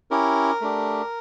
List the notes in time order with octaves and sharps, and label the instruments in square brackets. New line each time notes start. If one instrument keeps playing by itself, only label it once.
[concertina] C#4 E4 G4 A#4
A3 D4 G4